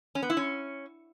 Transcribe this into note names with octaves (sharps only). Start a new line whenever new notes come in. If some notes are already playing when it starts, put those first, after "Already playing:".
C#4
B3
E4
C#4